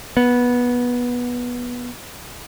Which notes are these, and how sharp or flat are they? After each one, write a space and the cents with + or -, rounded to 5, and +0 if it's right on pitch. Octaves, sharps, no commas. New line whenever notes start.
B3 -15